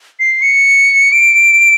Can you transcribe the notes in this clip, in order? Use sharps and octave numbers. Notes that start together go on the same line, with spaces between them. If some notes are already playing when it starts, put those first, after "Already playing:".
C7
C#7
D7